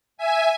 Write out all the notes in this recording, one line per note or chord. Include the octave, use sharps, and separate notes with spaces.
E5 G#5